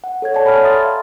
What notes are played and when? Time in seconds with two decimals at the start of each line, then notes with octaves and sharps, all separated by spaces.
0.04 F#5
0.22 A4 C#5 G#6
0.34 A4 C#5 D5 F#5 G#5 A5
0.46 B5 F6
0.63 E5 A#5 C6 D#6 A6
0.85 F5